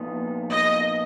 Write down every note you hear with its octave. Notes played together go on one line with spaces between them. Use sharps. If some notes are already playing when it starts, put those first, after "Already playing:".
Already playing: A#2 F3 B3 D#4
D#5